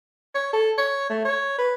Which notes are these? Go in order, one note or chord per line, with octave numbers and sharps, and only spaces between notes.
C#5
A4
C#5
A3
C#5
B4